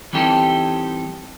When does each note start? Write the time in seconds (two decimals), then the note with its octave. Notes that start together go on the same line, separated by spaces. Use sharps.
0.13 E3 G3 C4 D#4 G4 A4